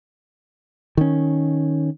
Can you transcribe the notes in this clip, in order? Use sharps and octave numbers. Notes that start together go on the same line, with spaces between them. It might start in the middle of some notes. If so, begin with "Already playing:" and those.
D#3 C#4